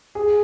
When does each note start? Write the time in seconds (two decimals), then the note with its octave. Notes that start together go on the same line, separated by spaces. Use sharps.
0.15 G#4